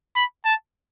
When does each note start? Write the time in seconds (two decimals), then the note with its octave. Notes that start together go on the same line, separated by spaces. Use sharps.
0.16 B5
0.45 A5